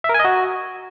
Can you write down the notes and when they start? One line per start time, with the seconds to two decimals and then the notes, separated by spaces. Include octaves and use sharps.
0.04 E5
0.09 A#4
0.14 G#5
0.19 D#5
0.25 F#4